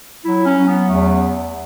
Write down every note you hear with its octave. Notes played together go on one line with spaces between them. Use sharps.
F#3 E4
C#4
F#3
B3
E2 A3